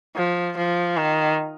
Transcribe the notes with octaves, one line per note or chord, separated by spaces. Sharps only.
F3
F3
D#3